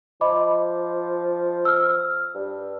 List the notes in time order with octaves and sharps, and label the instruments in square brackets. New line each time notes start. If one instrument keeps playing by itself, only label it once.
[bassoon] F3 [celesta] D#5 B5 D6
[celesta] E6 F6
[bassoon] G2